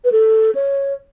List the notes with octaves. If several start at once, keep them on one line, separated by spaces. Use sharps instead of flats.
B4
A4
C#5